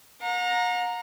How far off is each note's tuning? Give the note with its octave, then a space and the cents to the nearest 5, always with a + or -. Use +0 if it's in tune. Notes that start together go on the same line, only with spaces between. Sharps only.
F#5 -45 A#5 +0